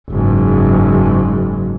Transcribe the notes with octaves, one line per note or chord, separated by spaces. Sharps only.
F#1 G#2